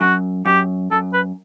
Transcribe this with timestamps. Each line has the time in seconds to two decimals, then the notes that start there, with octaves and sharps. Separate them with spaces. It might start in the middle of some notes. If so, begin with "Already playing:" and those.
0.01 F#2 F#4
0.45 F#2 G4
0.91 F#2 A4
1.14 B4